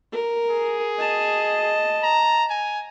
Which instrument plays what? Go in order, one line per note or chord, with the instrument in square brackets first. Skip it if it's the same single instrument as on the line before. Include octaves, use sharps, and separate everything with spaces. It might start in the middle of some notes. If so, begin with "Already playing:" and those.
[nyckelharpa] A#4
[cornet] G#4
[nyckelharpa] D#5 A5
[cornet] A#5
G#5